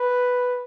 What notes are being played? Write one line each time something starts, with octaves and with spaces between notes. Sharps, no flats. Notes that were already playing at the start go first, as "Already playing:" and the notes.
Already playing: B4